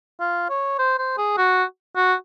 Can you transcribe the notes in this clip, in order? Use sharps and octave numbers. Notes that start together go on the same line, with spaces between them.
F4
C#5
C5
C5
G#4
F#4
F#4